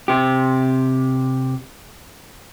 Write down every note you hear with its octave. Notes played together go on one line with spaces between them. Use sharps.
C3 G4